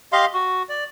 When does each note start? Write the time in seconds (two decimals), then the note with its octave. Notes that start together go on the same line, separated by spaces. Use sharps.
0.12 G4 D#5 F5 C6
0.34 F#4
0.69 D5